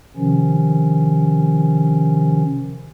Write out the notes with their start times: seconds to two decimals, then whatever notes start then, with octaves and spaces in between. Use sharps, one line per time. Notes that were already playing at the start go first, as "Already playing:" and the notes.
0.17 C3 D#3 F3 C#4